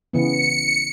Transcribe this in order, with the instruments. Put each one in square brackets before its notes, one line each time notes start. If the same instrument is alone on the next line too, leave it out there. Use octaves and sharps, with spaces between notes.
[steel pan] C#3 E3 B3 [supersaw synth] C#7